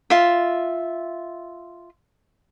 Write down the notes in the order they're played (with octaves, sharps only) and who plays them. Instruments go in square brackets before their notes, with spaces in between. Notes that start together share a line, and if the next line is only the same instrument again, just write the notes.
[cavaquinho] F4 E5